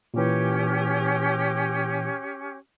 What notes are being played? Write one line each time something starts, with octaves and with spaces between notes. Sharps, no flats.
A#2 E3 C#4 G4